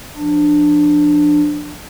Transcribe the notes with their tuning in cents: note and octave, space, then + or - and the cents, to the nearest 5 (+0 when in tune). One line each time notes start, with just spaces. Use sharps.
F3 +0 D4 +15